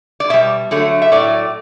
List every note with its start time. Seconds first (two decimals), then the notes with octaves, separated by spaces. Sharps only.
0.20 D5
0.30 B2 G3 E5
0.71 D3 F#3 A3
1.02 E5
1.12 A2 F#3 A3 D5